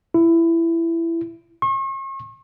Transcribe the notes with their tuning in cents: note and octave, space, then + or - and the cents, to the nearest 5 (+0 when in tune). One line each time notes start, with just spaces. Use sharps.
E4 +15
C#6 -40